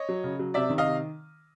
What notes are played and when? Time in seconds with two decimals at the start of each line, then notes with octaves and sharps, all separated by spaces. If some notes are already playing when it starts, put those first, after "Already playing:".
Already playing: C#5 D#5
0.09 F#3
0.24 C#3
0.39 F#3
0.54 C3 D5 E5
0.70 D#3
0.78 D#5 F5
0.86 C3